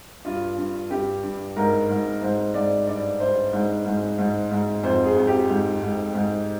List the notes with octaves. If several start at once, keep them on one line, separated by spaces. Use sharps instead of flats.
G2 F4
G2
G2 G4
G2
G#2 A#4
G#2
G#2 C5
G#2 D5
G2 D5
G2 C5
G#2
G#2
G#2
G#2
F2 C5
G#4
F2
G4
G#2
G#2
G#2